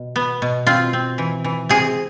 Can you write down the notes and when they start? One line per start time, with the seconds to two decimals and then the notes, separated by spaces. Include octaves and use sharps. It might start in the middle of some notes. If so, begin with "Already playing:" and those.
Already playing: B2
0.16 B3
0.42 B2
0.67 C4 F4
0.93 C4
1.18 E3
1.44 E3
1.69 C3 G#4